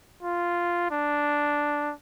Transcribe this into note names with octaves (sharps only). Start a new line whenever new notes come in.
F4
D4